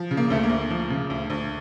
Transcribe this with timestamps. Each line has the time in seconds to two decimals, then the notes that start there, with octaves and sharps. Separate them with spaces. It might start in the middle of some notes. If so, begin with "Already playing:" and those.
Already playing: F3
0.11 C#3
0.17 A#3
0.30 D2 A3
0.43 A#3
0.49 D2
0.70 F3
0.90 C#3
1.10 D2
1.30 D2